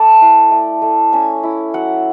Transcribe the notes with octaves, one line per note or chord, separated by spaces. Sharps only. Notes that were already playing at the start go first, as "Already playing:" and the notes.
Already playing: A3 D5 A5
E4
A3
A3
C#4 G#5
E4
F#3 F#5